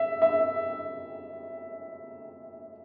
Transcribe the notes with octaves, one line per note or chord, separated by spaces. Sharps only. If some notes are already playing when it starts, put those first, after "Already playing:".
Already playing: E5
E5